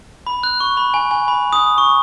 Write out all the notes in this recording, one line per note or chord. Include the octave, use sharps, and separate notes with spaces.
B5
F#6
C#6
B5
G#5
G#5
B5
D#6
C#6